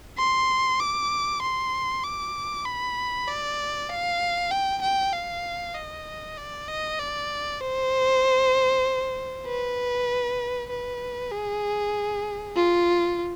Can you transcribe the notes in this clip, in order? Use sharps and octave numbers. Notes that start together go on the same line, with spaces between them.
C6
D6
C6
D6
B5
D5
F5
G5
G5
F5
D#5
D5
D#5
D5
C5
B4
B4
G#4
F4